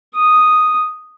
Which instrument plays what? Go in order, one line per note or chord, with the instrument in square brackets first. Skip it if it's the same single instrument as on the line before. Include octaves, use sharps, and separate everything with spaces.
[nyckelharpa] D#6